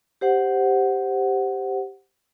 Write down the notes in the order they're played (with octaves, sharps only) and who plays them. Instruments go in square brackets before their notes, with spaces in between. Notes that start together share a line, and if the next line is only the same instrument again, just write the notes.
[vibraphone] G4 C5 F#5